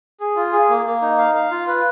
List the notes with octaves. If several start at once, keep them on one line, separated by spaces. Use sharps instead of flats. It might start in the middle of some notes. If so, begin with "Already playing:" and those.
G#4
F4
G#4
A#3
A#3
D#4
F5
F5
F4
B4